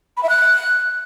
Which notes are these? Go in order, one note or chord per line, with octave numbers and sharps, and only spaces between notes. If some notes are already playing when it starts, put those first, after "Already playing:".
B5
E5
F#6